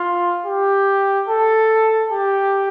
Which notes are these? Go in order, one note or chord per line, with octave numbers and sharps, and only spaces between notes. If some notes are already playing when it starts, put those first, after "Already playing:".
Already playing: F4
G4
A4
G4